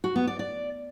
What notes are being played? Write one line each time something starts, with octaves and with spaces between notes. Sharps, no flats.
F#4
B3
D5
D5